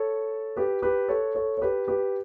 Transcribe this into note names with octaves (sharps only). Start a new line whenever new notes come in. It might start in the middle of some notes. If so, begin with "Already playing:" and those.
Already playing: A4 C#5
G4 B4
G4 B4
A4 C#5
A4 C#5
C#5
G4 B4
G4 B4